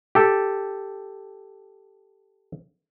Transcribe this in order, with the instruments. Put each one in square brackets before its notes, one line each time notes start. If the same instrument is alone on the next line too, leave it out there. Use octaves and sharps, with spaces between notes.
[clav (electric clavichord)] G4 A4